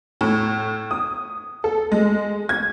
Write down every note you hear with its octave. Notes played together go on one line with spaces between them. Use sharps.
A2
D#6
A4
G#3
G#6